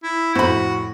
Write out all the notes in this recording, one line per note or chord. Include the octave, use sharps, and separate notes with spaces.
E4
F2 A2 F#4 C5 B5